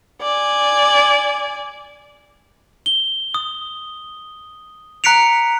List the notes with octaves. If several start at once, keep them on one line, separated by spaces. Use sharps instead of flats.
D5 G#5
G7
D#6
A#5 F#6 B6 C#7 D7 F7